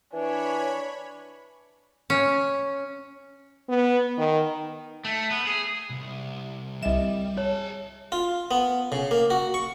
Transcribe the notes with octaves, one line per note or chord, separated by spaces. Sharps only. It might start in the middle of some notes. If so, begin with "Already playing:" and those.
E3 D4 C#5 G#5 B5
C#4
B3
D#3
A3
B3
G#4
C2
C2 G3 D#5 E5 E7
G#4 C#5 A5
F4
B3
C#3
A#3
F#4
C#6